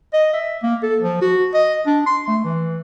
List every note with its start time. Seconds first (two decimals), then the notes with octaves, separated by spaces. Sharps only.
0.13 D#5
0.33 E5
0.63 A#3
0.83 A4
1.01 F3
1.21 F#4
1.54 D#5
1.86 D4
2.06 C6
2.28 A3
2.44 E3